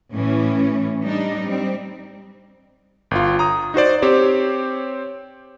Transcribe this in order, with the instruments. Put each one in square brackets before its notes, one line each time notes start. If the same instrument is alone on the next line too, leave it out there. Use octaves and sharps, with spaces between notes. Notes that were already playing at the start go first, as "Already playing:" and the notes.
[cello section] A2 E3 C#4
G3 D4 D#4
G3 C4
[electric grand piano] G1 F4
A#5 D#6
D#4 F#4 C5 D5
C4 G4 C5 C#5